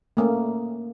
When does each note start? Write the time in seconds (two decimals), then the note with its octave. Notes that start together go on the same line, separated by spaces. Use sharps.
0.17 A3 A#3 C#4